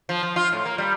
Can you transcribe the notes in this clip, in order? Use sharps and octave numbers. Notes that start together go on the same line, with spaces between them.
F3
F3
F4
A2
A#3
G3